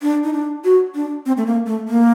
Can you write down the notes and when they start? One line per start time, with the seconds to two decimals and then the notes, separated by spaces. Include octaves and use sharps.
0.02 D4
0.24 D#4
0.33 D4
0.64 F#4
0.95 D4
1.26 C4
1.37 A3
1.46 A#3
1.67 A3
1.88 A#3